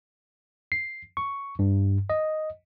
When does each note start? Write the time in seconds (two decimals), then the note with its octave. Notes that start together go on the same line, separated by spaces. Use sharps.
0.72 C7
1.17 C#6
1.59 G2
2.10 D#5